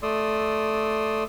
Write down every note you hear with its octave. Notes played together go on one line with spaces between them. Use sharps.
A3 D5 C6 D#6 E6